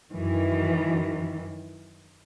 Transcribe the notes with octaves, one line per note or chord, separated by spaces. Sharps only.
F#2 D#3 E3